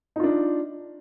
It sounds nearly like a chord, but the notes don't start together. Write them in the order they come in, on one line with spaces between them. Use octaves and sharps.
D#4 F4 D4